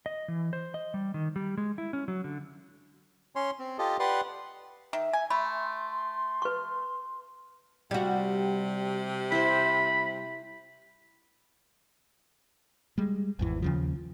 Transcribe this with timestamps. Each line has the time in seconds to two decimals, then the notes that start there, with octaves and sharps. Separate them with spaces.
0.06 D#5
0.28 E3
0.53 C5
0.74 D#5
0.94 G3
1.14 D#3
1.36 G3
1.58 G#3
1.78 E4
1.93 C#4
2.08 F#3
2.24 D3
3.36 C#4 C#5 C6
3.59 C4
3.79 F4 G4 A4 D#5
3.99 G4 B4 D5 F#5 C6
4.93 D#3 E5
5.13 G#5
5.30 A3 B5 C6
6.42 B4 C#6
7.91 C3 G3 F#4
9.32 E4 C5 B5
12.98 G3 G#3
13.39 G#1 E2 E3
13.62 D#2 C#3 F3